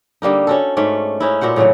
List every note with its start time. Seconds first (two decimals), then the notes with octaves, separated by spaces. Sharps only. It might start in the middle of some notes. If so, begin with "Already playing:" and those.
0.22 D3 G3 A#3 D#4
0.47 C#4 F#4 A4
0.77 G#2 A3 C#4 D5
1.20 C#4 D#4 E4
1.41 A#2 F#4 C5 F#5
1.56 A2 C#3 E3 F#3